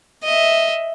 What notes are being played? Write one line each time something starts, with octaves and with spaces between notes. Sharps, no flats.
D#5 E5